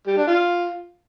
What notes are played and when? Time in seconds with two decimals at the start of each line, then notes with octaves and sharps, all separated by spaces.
0.07 G3
0.17 D4
0.27 F4